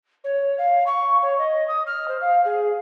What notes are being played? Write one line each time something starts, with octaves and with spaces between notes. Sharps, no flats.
C#5
F5
C#6
C#5
D#5
D#6
F6
C5
F5
G#4